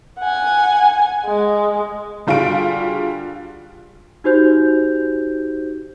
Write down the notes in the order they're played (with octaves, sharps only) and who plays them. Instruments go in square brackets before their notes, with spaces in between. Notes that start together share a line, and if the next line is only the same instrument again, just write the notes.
[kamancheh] F#5 G#5
G#3
[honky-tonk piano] D3 G3 F4 F#4 G#4 D7
[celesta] D#4 F#4 G4 C5 G6